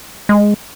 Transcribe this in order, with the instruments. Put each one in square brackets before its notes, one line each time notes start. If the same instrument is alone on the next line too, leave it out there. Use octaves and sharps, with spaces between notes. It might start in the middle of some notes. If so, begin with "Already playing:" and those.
[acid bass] G#3